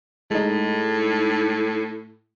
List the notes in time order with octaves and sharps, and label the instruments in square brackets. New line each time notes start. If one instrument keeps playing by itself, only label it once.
[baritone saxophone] A2 [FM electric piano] G#3 D#4